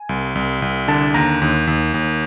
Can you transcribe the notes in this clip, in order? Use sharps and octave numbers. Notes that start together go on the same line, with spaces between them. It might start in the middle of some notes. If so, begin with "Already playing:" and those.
Already playing: G#5
C2
C2
C2
D3 A5
D#2 A#5
D#2
D#2
D#2